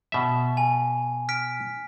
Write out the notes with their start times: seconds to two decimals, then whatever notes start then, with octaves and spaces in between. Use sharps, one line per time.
0.12 B2 E5
0.57 G#5
1.29 F6 B6 D7